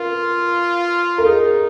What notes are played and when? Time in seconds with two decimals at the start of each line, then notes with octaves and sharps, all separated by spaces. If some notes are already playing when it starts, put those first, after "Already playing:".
Already playing: F4 A#4 B4
1.18 A#4
1.25 D#4 G#4